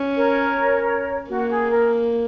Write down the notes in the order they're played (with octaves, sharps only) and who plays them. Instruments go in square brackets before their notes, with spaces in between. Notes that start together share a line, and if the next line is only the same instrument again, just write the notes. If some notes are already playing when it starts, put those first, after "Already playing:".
Already playing: [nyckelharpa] C#4
[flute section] A#4 C#5
[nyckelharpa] A#3 [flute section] F#4
[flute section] G#4
A#4